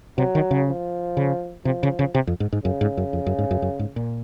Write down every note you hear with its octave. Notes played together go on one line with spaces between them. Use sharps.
C3 F#3
D#3
C#3
F3
C#3
C3 F3
C#3
C#3
C3
F2
G#2
G#2
F#2 C#3
G#2
F#2
F2
F#2
G#2
F#2
F#2
G#2
A#2